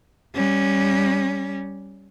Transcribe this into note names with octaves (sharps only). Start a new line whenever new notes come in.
G3 C#4